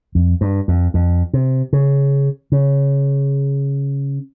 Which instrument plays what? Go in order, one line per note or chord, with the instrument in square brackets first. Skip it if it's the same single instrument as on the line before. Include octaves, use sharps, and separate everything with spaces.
[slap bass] F2
G2
F2
F2
C3
C#3
C#3